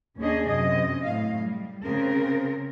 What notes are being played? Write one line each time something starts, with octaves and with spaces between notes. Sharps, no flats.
D#2 A#3 C#4 D4 G#4 D#5
F#2 C3 F#3 D#5
A2 F5
G3
C#3 C4 A#4